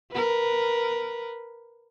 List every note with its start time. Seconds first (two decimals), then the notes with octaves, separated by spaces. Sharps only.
0.12 A#4 B4